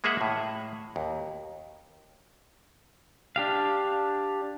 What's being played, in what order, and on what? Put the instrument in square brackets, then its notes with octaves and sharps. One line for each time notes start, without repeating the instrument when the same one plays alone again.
[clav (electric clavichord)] G#3 A#3 G#4 E5 F#5
A2
D#2
[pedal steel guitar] D4 G4 F5